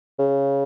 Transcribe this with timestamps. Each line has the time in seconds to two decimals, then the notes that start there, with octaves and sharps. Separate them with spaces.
0.19 C#3